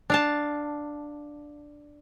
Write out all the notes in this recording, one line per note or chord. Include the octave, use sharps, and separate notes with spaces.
D4 F5 A5